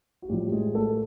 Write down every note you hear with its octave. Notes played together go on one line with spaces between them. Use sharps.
F#4
A2 F3 G3 G4
G4
G#3 G#4
A3 A4